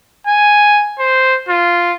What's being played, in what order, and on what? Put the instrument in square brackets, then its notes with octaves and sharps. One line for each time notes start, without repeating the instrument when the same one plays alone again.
[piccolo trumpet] G#5
C5
F4